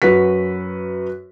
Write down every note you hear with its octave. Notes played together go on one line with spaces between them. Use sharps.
F#2 F#4 B4 B6